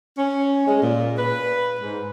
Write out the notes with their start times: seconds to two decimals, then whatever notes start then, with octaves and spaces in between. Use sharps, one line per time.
0.17 C#4
0.67 G#3
0.82 A#2
1.18 B4
1.80 G#2